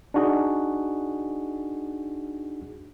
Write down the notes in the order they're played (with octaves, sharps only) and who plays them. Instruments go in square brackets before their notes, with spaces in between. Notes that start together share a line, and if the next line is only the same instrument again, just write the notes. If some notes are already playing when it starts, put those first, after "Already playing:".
[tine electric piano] D4 D#4 F#4 G#4